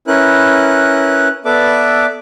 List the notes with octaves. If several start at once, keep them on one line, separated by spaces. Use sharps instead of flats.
C#4 E4 A#4 B4 F#6
B3 A4 B4 D5 E5 D6